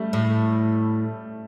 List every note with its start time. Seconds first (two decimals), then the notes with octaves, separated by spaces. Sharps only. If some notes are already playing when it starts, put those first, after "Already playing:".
Already playing: G3 A3
0.13 A2